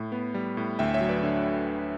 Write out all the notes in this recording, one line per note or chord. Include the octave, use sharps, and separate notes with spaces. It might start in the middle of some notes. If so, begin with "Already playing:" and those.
Already playing: A2
B3
G3
A2
D2 E5 G5
C#5 E5
F#3
B4 D5
D3